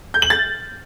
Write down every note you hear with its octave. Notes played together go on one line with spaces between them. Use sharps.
G6
F#7
A6